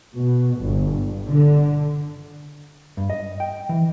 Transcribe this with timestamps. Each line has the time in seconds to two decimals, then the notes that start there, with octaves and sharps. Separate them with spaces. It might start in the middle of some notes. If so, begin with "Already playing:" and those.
0.15 B2
0.59 G1
1.26 D3
2.97 G2
3.10 D#5
3.40 G5
3.69 E3